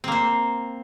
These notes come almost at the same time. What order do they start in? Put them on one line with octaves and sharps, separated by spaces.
C4 A#3 C5